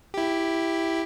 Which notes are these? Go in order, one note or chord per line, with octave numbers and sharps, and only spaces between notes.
E4 G4